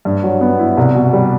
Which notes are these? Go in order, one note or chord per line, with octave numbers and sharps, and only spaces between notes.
G2
F#3
B3
E4
C2
B2
G3